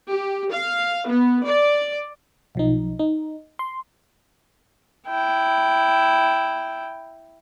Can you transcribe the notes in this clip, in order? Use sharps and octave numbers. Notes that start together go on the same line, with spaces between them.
G4
F5
B3
D5
B1 F3 D#4
D#4
C6
E4 G5